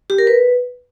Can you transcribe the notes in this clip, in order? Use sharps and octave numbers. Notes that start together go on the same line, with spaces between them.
G4
A#4
B4